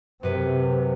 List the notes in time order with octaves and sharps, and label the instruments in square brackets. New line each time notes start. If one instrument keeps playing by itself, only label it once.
[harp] F#2 B4 B5 [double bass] C3